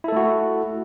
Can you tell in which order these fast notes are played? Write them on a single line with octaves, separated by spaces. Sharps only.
E4 A4 A3 F#4